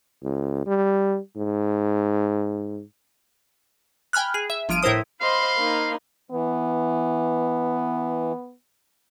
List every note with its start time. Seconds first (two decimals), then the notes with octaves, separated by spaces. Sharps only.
0.24 C#2
0.67 G3
1.37 G#2
4.13 G5 G#5 B5 F6 F#6
4.34 G#4
4.50 E5
4.69 G1 F3 F6 D7 D#7
4.83 A2 E4 A#4 C5 D#6
5.21 C5 D#5 F5 B5 C6
5.57 A#3 D#4
6.31 E3 B3